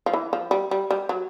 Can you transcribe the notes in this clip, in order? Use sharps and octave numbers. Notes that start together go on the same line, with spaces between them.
F3
E3
F3
G3
G3
G3
F#3